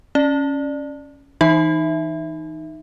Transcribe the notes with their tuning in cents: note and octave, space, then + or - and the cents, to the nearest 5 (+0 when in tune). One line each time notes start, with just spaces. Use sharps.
C#4 +0 D5 +15
E3 -15 D#4 +0 E5 +0